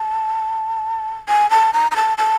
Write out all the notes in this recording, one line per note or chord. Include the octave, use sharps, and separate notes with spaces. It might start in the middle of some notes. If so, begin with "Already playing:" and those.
Already playing: A5
G#5
A5
A#5
A#5
A5
A5